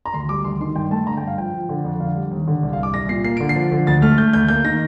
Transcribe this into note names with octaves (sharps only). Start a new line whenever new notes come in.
A#5
D2 C6
G3 D6
D2 C6
D#3 C6
G2 G5
A3 A5
D3 A#5
G5
G2 F5
F3 G5
F3
D3
F2
D3 F5
G3
D#2
D3
C2
F5
C2
D6
C2 A#6
A#2 C7
A#3 C7
D3 D7
C7
F3
D3
D2 A6
A3 F6
A3 G6
D2 G6
A#3 G6
D#3 A#6